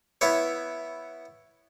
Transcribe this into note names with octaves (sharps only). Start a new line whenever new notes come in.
B3 E4 C#5